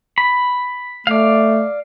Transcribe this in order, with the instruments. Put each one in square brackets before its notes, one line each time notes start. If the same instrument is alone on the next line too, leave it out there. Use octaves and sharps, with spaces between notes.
[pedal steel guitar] B5
[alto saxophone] A3 [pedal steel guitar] D5 F5